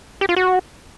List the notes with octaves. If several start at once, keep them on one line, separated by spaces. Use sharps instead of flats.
G4
F4
F#4